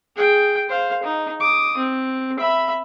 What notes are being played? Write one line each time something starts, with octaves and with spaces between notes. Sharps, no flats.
G#4 G5
C5 F5
D#4
D6 D#6
C4
E5 B5